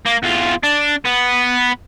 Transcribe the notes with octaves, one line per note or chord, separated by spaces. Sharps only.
A#3
E2 F4
D4
B3